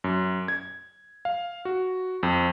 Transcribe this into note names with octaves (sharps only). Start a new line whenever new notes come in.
F#2
G#6
F5
F#4
F2